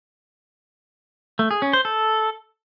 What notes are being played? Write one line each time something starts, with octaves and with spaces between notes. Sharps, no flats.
A3
G#4
C#4
C5
A4